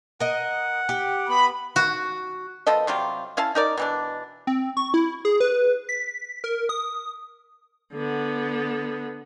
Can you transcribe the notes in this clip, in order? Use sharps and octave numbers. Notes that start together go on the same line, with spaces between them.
A#4 D#5 F#5
G4
B3 B5
F#4
F3 B3 A4 D#5
C3 F#3 G3 F4
C#4 E4 F5 A5
D#4 A#4 D5
B2 E3 D4
C4
C#6
E4
G#4
B4
B6
A#4
D#6
D3 B3